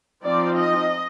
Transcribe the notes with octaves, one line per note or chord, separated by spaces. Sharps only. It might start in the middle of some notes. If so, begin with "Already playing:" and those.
F3 C4 D#4 D5
D#5